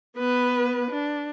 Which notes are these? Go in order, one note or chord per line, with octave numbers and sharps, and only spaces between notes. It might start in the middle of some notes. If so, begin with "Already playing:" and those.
B3 B4
D4